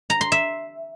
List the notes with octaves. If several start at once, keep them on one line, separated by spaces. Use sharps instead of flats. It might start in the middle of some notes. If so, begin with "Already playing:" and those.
A#5
C6
E5